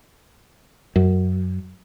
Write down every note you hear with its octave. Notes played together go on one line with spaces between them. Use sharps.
F#2